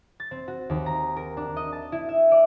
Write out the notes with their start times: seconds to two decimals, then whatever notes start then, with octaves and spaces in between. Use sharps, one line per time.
0.20 A6
0.31 C4
0.48 F#4
0.69 D#2
0.86 A#5
1.17 A#4
1.37 D4
1.57 D#5
1.72 A5
1.92 E4
2.09 E5
2.32 D5